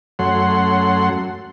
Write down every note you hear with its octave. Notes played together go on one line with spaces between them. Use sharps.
F#2 F#3 A3 C#4 F#5 C6